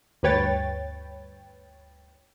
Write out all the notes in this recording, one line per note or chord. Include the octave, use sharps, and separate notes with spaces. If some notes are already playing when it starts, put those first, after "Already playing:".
D2 G2 B4 C#5 G5 A6